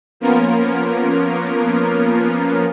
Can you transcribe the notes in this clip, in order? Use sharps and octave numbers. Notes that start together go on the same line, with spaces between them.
F3 A#3 B3 C#4 F4 A#4